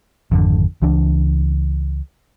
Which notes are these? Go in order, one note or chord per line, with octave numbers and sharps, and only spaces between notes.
G#1 F2 D3
C#2 E3 D4